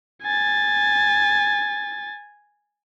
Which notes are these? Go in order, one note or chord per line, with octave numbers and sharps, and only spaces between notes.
G#5 A6